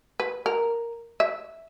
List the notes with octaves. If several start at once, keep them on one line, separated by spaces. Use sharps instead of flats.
B4
A#4
E5